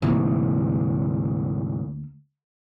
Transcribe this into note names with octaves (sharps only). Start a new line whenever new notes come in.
D2 G#2 C3 E3 A#3